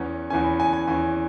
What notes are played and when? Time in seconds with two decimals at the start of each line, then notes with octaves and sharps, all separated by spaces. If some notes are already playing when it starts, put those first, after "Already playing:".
Already playing: E2 E3 C#4 C#5
0.30 E2 E3 C#4 G#5
0.44 B5
0.60 G#5
0.73 G#5
0.87 E2 E3 C#4 G#5